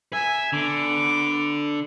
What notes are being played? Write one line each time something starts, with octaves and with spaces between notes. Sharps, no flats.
E5 G#5
D3 B3 D6